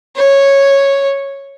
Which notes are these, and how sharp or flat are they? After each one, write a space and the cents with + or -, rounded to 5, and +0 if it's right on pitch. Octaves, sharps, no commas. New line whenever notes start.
C#5 -5